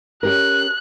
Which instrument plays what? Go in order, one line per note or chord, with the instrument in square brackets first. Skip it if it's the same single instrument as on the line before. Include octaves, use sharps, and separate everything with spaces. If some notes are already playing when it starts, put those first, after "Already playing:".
[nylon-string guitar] C#4 G4 A#4 [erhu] F#6